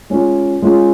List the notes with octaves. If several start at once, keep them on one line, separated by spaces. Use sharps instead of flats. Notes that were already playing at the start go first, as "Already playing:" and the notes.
G#3 C#4 F4
G#3 C#4 F4